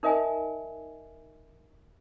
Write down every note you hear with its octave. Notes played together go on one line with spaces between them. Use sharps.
D#4 A#4 D#5 E5 G#5